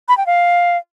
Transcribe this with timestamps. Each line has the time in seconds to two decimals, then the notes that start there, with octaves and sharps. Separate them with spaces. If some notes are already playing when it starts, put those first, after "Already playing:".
0.08 B5
0.18 G5
0.27 F5